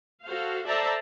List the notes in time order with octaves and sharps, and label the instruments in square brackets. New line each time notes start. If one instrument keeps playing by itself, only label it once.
[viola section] F#4 A4 C5 F5
A4 C5 D5 E5 A5 A#5